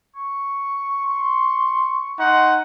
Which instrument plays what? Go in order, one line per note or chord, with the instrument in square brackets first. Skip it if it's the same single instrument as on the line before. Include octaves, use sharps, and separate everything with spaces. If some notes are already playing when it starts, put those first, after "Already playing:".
[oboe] C#6
[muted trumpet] C6
[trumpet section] D#4 F#5 [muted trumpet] C6